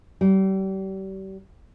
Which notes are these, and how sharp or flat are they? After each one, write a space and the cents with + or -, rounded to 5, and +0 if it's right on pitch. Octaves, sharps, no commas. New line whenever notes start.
G3 -35